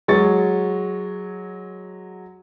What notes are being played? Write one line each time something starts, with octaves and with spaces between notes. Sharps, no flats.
F#3 G#3 C#6 A6